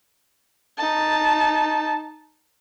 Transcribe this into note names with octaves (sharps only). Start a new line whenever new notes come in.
D#4 A5